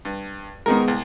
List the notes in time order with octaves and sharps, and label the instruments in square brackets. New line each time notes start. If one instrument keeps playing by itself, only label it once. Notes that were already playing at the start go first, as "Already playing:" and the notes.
[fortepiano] G2
[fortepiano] G#2 D#3 A#4 [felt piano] G#3 B3
[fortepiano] C2